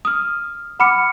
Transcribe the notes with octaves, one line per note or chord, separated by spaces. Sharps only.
D#6 F6
F#5 B5 D6 F6 C#7